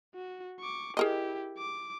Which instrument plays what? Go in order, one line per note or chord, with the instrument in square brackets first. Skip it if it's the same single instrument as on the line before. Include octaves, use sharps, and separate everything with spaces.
[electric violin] F#4
C#6 D6
[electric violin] E4 G4 [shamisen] G#4 A#4 D#5
[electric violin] D6